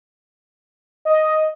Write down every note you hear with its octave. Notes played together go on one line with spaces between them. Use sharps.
D#5